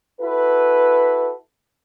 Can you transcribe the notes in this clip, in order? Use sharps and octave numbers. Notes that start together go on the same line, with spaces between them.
E4 F#4 A4 B4